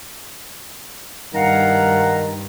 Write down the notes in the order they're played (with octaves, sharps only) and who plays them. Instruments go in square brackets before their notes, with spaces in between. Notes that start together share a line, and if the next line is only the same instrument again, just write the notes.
[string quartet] G2 [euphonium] D#3 [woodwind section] F5 F#5 A#5